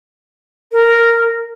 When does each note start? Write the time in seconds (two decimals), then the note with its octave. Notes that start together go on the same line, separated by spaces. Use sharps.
0.72 A#4